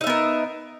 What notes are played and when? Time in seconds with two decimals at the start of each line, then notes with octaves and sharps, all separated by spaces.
0.01 D#4
0.04 E5
0.07 B3
0.10 A#4